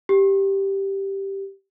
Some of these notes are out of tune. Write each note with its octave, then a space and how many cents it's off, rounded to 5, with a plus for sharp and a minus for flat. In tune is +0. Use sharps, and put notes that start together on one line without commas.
G4 -5